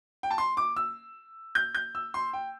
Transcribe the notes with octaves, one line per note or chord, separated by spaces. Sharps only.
G5
A5
C6
D6
E6
G6
G6
E6
C6
G5